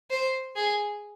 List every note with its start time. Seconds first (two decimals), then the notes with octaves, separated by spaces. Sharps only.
0.10 C5
0.56 G#4